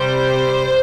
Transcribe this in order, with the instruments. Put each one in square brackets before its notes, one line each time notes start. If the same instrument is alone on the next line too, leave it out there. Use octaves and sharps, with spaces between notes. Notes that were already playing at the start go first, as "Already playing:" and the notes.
Already playing: [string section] C3 G3 C5